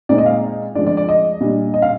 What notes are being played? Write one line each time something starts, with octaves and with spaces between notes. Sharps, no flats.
A#2 G#3 C4 D#4 D5
D#5
F5
F3 G#3 D4 D5
D5
D5
D#5
A#2 G3 D4
D#5
F5